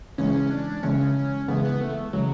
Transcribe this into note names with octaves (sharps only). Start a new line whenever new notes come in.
C#3 E3 G#3 C#4
D4
C#3 E3 G#3 C#4
C#3 E3 G#3 B3
B3
A3
C#3 E3 F#3 G#3